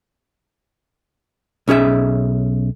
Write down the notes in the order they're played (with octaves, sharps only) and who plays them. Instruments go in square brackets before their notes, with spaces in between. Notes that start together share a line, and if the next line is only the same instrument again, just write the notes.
[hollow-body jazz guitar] B1 C#4 G#4 E5